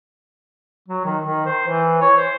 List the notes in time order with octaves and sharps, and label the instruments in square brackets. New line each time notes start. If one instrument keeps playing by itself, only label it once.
[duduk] F#3
D#3
D#3
C5
E3
C#5
C5